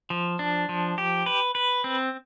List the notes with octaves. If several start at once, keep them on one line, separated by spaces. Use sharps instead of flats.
F3
D4
F3
G4
B4
B4
C4